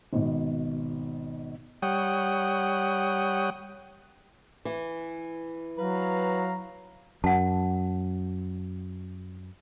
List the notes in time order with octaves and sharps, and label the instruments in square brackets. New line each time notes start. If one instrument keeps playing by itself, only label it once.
[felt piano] G#1 B2
[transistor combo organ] G3 C#5 F#5 G5 D#6
[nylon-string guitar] E3
[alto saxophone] F#3 [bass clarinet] B4 [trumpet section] F5 A#5
[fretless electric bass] F#2 [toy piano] F#5 A5